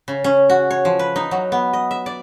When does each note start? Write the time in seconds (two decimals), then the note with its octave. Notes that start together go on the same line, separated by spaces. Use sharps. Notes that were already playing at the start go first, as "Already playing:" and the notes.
0.08 C#3
0.24 C#4
0.50 F#4
0.71 C#5
0.85 F3
0.99 B4
1.16 D#4
1.31 F#3
1.52 B3
1.73 D#5
1.91 E5
2.06 D5